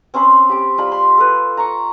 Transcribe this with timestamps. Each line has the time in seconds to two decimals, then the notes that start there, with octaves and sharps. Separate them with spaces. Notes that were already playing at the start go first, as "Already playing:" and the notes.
0.14 C4 C#4 C5 B5
0.49 G4 D6
0.78 G3 F4 A5 B5
0.92 C6
1.18 A4 B4
1.57 A#5 C#6